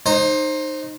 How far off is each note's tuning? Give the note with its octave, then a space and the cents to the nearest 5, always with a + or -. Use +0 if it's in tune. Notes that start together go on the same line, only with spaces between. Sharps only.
D#4 -15 C5 +20